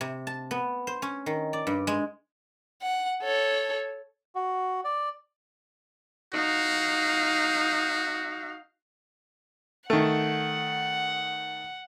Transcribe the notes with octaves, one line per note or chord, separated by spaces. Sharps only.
C3
A5
B3
C5
C#4
D#3
D5
G2
G#3
F#5
A4 C#5
F#4
D5
D#4 F#4 F5
D#3 A3 F#5